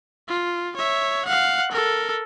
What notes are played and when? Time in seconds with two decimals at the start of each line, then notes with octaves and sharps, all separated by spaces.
0.28 F4
0.76 C#5 E5
1.26 F5 F#5
1.72 A4 A#4